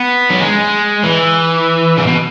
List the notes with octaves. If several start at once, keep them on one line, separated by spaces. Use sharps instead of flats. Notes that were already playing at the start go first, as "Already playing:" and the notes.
Already playing: B3
F#3
G#3
E3
C#3
B2